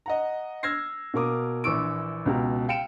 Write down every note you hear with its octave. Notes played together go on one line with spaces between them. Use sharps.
D#5 F#5 A#5
E6 F6 G#6 A#6 C7
B2 A#3 A#4 D6 D#6
A#1 E3 C#6 D6 E6 D7
C#2 B2 G4 A#5
F5 G5 C#7 D7 E7